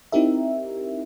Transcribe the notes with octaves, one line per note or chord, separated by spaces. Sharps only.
C4 D#4 E4 G4 A#4 E5